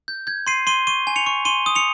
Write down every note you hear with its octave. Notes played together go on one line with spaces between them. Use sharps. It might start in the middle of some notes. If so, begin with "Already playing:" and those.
G6
G6 G#6
C6 C7 D#7
C6 D#7 G7
C#6 D#7 G7
G#5
C#7 F7
C#6
C6 D#7 G7
D#6
C#7 F7